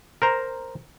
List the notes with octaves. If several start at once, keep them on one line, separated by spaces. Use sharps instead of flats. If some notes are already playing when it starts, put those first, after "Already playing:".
A#4 C5 A#5